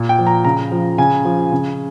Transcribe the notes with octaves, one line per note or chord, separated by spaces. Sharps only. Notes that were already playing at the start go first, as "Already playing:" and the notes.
Already playing: A#2
G5
F3
A#5
C#3 A#5
F3
C#3 G#5
F3
C#3